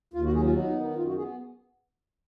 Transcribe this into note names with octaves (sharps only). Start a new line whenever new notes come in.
D#2 F4
F#4
F#3 G#4
F4
B3 D#4
D#3
F#2 F4
F#4
B3 G#4